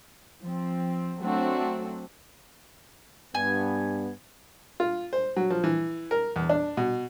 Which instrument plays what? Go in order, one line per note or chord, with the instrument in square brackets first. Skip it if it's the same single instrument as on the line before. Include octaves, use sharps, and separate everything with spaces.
[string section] F3 C4
F#3 A3 C4 D4 F#4
[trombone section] G2 B3 [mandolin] G#5
[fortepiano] F4
C5
F#3
F3
E3
A#4
E2
D4
B2